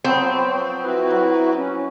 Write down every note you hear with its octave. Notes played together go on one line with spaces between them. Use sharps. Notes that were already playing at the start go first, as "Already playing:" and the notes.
F3 F#3 B3 C4
E4 F#4 B4
F#3
C#4